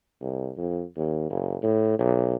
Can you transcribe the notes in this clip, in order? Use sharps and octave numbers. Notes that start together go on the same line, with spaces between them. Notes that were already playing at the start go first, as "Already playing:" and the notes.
C2
F2
D#2
F#1
A2
B1